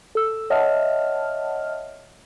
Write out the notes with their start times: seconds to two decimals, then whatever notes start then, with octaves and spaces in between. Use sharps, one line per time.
0.15 A4 E6
0.50 C#5 D#5 E5 F#5 A5 F6